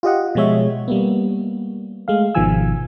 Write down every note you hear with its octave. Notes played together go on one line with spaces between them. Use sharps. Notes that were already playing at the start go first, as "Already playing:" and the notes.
F4 G4 D#5 F#5
B2 F3 G#3 C#5 E5
G3 A#3 B3
G#3 A3 F5
G#1 B2 D#3 F3 G#5 E6